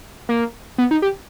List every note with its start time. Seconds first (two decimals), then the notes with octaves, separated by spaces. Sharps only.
0.29 A#3
0.78 B3
0.91 D#4
1.02 G4